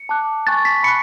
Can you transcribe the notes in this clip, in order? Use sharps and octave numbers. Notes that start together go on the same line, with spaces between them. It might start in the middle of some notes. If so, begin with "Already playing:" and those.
Already playing: C#7
A5 D6 F#6
G#5 C#6 F#6 A6
B6
B5 F#6 C#7